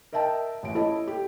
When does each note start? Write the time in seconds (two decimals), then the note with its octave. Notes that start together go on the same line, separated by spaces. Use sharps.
0.12 A#4 D#5 E5 G5 A5
0.63 A1 D7
0.75 E4 A4 C#5 D#5
1.08 G4